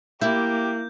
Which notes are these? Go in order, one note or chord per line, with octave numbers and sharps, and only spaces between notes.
A#3 E4 G4 G6